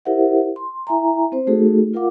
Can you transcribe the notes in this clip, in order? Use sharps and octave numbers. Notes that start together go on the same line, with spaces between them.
E4 G4 A#4 C5 E5 F#5
C6
E4 E5 G#5 A#5
C4 C5
A3 D#4 F#4 G#4 A4
F4 A#4 F5 F#5 D6